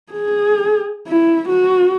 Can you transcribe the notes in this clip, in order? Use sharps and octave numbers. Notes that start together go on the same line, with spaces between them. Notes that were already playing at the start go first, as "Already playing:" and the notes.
G#4
E4
F#4